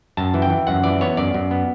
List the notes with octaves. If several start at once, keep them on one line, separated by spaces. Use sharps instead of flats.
F#2 A5
E3
G5
E3
F#2 F#5
E3 D5
B3 C#5
F#2 D5
F#2
B3